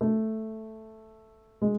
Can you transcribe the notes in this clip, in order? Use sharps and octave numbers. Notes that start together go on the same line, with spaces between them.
A3
G#3